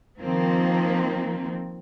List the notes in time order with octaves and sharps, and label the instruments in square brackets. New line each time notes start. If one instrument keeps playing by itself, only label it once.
[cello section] D#3 F3 A#3 C4